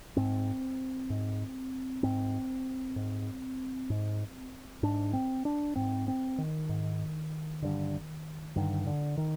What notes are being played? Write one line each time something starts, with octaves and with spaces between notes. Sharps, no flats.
G#2 C4
G#2
G#2 C4
G#2
G#2
G#2 D4
C4
D4
G#2 C4
C4
D#3
G#2
G2 D3
G2 D3 D#3
D3
D#3